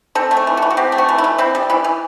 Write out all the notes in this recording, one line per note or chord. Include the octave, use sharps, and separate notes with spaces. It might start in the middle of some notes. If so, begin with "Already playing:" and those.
C4 A4
A3
A4
E3
F#4
E3
F#4
C4 G4
A3
F#4
E3
E4
E3
C4 E4
G3
E3 E4
E3